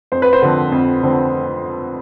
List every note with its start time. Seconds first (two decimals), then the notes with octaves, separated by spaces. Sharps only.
0.12 F2 C5
0.22 B4
0.33 C5
0.42 D3 F3 C4
0.72 F2
1.02 D3 F3 C4